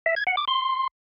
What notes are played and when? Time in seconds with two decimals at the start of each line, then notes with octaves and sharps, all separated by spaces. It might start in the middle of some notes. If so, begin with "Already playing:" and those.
0.06 E5
0.16 G#6
0.27 F#5
0.37 D6
0.48 C6